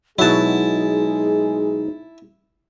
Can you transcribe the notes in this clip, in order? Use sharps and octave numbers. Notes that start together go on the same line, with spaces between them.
B2 F#3 G#3 D#4 E4 G#4 A5